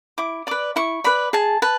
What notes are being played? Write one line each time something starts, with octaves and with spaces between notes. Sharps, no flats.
E4 D6
B4 D5 D6
E4 C#6
B4 D5 B5
G#4 A5
B4 A5